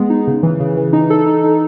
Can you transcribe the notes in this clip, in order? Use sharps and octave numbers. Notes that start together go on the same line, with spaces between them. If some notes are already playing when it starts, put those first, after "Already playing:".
Already playing: G#3 B3 G#4
D#4
C#3
E3
C#3
E3
D#4
A4
D#4
D#4